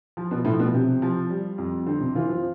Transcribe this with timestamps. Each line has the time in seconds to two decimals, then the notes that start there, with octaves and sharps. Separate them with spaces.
0.17 F3
0.31 B2
0.45 A2 F3
0.60 B2
0.74 C3 G4
1.02 F3
1.30 G3
1.58 F2
1.86 D3 C4
2.00 C3
2.15 E3 F4
2.29 F3